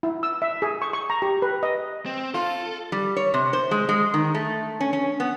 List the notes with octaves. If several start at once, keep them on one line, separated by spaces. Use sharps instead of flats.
E4
E6
E5
G#4
C#6
C#6
A#5
G4
B4
D#5
C4
F4 A4
G3
C#5
C3
C5
G#3
G#3
D#3
A3
C#4
C#4
B3